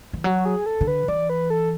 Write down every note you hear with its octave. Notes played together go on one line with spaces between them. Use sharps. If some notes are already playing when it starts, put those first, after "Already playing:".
E3
F#3 F#4
G#4
A4
D3
B4
E3 D5
B4
A4